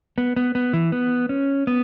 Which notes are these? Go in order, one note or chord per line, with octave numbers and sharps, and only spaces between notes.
B3
B3
B3
E3
B3
C#4
B3